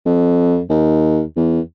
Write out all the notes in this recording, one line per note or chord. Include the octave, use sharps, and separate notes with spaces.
F2
D#2
E2